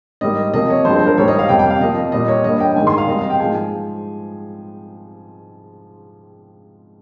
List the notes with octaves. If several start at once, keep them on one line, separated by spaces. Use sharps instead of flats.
G#2 G3 A#3 D#5
C3 F3 A#3 D#5
C#5
G2 F3 G#3 C5
C5
A#4
G#2 G3 A#3 C#5
D#5
F5
F2 C3 G3 A#3 G5
G5
F5
C3 F3 A#3 D#5
A#2 G3 A#3 D#5
C#5
G2 G3 A#3 D#5
G5
G#2 D#3 G#3 G#5
C6
F5
C3 G3 A#3 D#5
F5
G5
G#2 F3 G#3 G#5